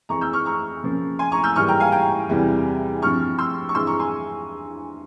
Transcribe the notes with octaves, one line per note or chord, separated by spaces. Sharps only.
F2 E3 G#3 C4 A#5 C#6
E6 G6
C#6 F6
A#5 C#6
C#3 F3 A#3 C#4
G#5 C6
A#5 C#6
E6 G6
G#2 E3 G3 A#3 C#6 F6
G5 A#5
F5 G#5
G5 A#5
E2 C3 E3 G3
G2 F3 C4 C#6 F6
C6 E6
C#6
G2 E3 G#3 C4 C6 E6
A#5 C#6
G#5 C6